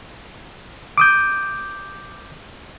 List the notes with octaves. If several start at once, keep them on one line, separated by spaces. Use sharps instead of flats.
D6 D#6 G6